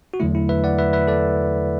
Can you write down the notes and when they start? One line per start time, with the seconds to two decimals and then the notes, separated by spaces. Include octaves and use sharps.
0.14 F#4
0.20 E2 D3 F#3 A3 E4
0.35 E4
0.49 B4 E5
0.64 D5 F#5
0.78 B4 E5
0.93 B4 E5
1.08 A4 D5